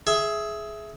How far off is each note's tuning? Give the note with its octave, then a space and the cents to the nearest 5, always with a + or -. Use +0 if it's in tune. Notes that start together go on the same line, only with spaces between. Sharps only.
G#4 +15 E5 +0